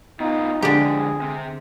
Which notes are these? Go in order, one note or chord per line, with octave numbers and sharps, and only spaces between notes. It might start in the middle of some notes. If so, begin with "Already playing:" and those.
B2 D#4 F4
F2 D3 G#3 G4 G#4
C3